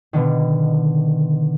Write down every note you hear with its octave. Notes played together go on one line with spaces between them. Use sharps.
B2 D3 D#3